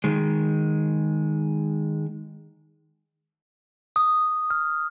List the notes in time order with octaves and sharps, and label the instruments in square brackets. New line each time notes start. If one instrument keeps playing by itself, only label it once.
[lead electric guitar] D#3 G#3
[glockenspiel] D#6
F6